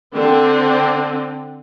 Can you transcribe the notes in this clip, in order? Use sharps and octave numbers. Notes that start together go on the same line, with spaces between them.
D3 C4